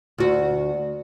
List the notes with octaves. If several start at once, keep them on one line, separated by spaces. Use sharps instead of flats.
D2 F#4